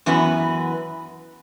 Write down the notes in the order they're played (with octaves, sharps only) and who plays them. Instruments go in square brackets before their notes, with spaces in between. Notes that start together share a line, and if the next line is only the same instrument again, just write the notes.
[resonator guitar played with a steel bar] F#2 E3 B3 F#4 B4